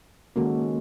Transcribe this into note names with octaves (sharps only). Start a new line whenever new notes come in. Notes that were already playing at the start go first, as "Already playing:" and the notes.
D#3 G#3 A#3 C#4 F#4 A4